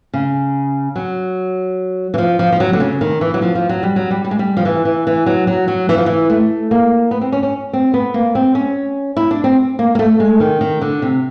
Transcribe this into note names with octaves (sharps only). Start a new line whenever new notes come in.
C#3
F#3
E3
F3
F3
F3
F#3
D3
C#3
D#3
E3
F#3
F3
F3
F#3
G3
F#3
G3
G3
G#3
G3
F3
E3
E3
E3
F#3
F#3
F#3
E3
F3
E3
A3
A#3
B3
C4
C#4
C#4
C4
B3
A#3
C4
C#4
E4
D4
C4
A#3
A#3
A3
G#3
D#3
D#3
D3
C3